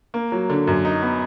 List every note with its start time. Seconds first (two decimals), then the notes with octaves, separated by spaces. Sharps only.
0.14 A#3
0.32 F#3
0.50 D3
0.67 F#2
0.85 D#4
1.02 B3